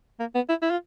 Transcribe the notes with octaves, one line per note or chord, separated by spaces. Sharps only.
A#3
B3
E4
E4
F4